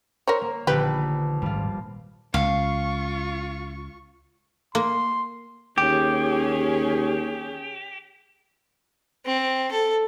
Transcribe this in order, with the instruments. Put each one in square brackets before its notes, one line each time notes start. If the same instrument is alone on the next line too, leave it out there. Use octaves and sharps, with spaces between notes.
[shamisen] A#4 C5 C#5
[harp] A#3
[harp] A#1 B3 [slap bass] D3 D#3 [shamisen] G4 B4
[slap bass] D#1 G#1 [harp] G3 F4
[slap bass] C#2 [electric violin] F4 C#6 [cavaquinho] F5
[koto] A#3 [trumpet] C6
[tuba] D#2 [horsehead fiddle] C#4 G#4 [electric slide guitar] G4
[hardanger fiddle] C4
A4